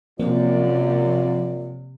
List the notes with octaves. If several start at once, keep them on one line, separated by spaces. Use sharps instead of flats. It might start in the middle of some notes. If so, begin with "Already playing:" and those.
F#2 C3 F3 A#3 C4 F4 D5